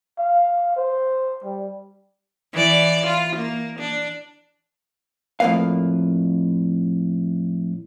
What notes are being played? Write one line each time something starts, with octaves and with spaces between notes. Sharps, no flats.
F5
C5
G3
E3 D5
F4
A#3
D4
F2 A2 A#3 B4 F5